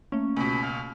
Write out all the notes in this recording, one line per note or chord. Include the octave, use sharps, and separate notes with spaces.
A3 A#3 C#4
C#2 B2 B5
F5